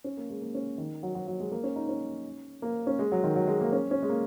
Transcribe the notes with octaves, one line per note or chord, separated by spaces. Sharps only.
C#4
A#3
G#3
A#3
C#4
D#3
F#3
F#3
F#3
G#3
A#3
C#4
D#4
C#4
A#3
C#4
G#3
F#3
D#3
F#3
G#3
A#3
C#4
C#4
G#3
A#3